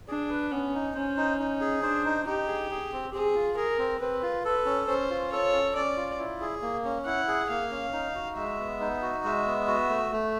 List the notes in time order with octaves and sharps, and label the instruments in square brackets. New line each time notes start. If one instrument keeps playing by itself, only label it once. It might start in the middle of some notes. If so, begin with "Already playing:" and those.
[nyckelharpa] D4 [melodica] G#4
[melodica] B4
[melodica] B3 [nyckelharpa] C#4
[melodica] D#4
[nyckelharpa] C#4 [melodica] C5
[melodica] D#4
D#4
G#4
[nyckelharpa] D4 [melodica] C5
[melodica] D#4
[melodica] D#4 [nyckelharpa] G4
[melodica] G#4
G#4
C4
[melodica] C4 [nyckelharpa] G#4
[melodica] F4
[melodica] G#4 [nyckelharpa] A#4
[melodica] C4
[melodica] C4 [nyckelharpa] B4
[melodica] F4
[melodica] A4 [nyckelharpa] B4
[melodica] C#4
[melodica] C#4 [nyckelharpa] C5
[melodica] F4
[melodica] A4 [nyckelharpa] C#5
[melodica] C#4
[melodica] C#4 [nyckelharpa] D5
[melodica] F4
E4
G#4
A#3
C#4
[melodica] E4 [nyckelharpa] F#5
[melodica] G#4
[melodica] A#3 [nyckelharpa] F5
[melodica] C#4
D#4
F#4
[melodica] G#3 [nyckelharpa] E5
[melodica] B3
D#4
F#4
[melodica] G#3 [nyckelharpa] E5
[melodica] B3
F#4
A3
A3